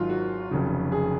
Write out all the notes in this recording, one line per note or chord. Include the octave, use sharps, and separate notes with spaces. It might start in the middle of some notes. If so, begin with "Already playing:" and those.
Already playing: G#1 G#2 F#3 F4
F#4
F1 F2 C#3 F#3
G#4